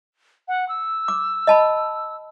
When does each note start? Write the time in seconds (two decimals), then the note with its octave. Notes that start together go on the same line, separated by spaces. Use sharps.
0.48 F#5
0.69 E6
1.08 D6
1.47 D#5 A5 B5